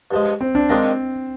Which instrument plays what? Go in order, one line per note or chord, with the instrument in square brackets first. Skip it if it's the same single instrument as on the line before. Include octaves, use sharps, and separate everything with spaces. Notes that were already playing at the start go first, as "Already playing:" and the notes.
[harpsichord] G2 F3 G#3
[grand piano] C4
D4
[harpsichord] D#3 G#3 D4 F4 A#4 [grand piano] C4